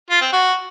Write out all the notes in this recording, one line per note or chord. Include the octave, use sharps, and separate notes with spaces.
F4
C4
F#4